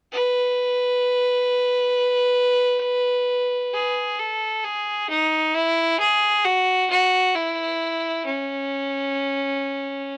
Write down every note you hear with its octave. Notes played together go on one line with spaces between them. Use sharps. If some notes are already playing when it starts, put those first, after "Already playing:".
B4
G#4
A4
G#4
D#4
E4
G#4
F#4
F#4
E4
C#4